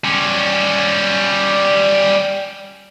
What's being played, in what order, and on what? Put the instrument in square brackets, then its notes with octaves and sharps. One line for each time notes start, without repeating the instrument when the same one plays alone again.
[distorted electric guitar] G3 C#4